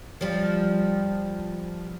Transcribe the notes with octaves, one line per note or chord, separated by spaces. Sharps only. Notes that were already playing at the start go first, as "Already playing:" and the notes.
F3 G3